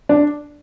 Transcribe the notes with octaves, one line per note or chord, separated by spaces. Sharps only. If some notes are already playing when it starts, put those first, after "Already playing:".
D4